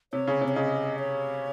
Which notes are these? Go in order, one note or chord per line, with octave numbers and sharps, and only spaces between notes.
C3 C#5
C#3
C3
C#5
C#3 D#5
C#5